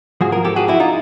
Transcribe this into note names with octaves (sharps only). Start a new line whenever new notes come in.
G#2 F3 F#4 G#4
G#4 A#4
G4 A4
F#4 G#4
E4 F#4
D#4 F4